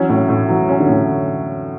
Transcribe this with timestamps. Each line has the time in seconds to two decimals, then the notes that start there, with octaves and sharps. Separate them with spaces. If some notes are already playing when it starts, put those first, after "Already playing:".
Already playing: E3 F#3 C#4
0.09 A2
0.29 A2
0.49 E3 F#3
0.69 C#4
0.79 D3
0.89 A2